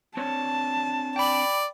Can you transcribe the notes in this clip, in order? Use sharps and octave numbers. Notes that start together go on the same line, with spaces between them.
C4 D4 C#5 A5
D5 G5 B5